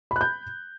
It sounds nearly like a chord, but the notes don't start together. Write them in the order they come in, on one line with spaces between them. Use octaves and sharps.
B5 F#6 G6